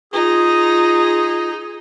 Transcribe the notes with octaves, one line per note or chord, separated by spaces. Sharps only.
D#4 F4 G#4